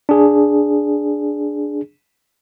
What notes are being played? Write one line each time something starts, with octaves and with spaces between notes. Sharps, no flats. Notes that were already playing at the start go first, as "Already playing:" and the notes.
D4 G#4